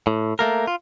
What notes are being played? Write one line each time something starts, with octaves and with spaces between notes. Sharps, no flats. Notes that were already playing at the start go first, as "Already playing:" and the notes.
A2
A3 A#3 A#4
F4